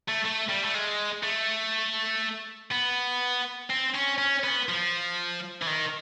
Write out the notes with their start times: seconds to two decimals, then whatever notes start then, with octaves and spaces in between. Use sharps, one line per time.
0.09 A3
0.26 A3
0.50 G3
0.65 A3
0.74 G#3
1.23 A3
2.71 B3
3.70 C4
3.95 C#4
4.18 C#4
4.44 B3
4.69 F3
5.62 E3
5.67 D#3